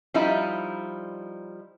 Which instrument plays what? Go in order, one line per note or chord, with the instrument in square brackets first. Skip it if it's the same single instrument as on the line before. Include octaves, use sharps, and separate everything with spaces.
[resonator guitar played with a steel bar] F3 G3 D#4 E4